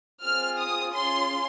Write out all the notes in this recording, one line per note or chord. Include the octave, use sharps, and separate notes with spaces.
C4 F4 G#4 F6
D#6
C#4 F4 G#4 C6